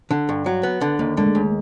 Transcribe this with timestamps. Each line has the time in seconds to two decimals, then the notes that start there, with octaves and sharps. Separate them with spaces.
0.11 D3
0.29 G2
0.46 F#3
0.63 B3
0.81 D3
0.99 D#2 A#3
1.17 D3 G#3
1.27 A3
1.35 D#2